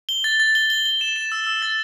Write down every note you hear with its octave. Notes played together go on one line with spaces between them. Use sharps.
G7
A6
A6
G7
G7
G7
E7
E7
E6
E6
A6